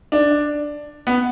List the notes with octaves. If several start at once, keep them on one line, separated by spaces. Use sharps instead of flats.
D4
B3